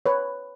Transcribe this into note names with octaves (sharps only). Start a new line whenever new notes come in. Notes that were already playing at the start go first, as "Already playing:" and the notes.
B4 C#5